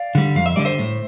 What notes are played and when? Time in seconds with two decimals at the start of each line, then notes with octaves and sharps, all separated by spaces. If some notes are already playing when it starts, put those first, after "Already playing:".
Already playing: D5 F5
0.15 D3 G3
0.35 F2 F5
0.46 E5
0.56 D3 G3 D5
0.65 C5 E5
0.79 A2